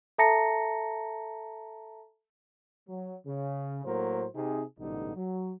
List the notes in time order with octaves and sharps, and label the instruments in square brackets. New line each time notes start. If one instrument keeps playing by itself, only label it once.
[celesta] A4 E5 A5 A#5 A#6 C#7
[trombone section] F#3
C#3
A2 F#3 A#3 A#4 C5
C3 D#4 G#4
A1 G#2 B2 D3 G3 D#4
F#3